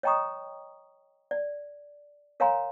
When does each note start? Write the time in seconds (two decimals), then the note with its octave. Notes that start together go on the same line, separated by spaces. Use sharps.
0.03 C#5 D#5 G5 A#5 C#6 D#6
1.31 D5
2.40 A#4 C#5 F5 G#5 A#5 C6